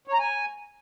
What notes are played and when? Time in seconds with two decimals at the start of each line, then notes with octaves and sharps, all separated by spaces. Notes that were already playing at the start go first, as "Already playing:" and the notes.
0.08 C#5
0.13 A#5
0.19 G#5